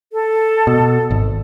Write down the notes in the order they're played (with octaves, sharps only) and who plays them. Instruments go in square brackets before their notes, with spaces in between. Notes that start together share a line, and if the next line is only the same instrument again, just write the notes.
[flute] A4
[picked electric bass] B2
G#1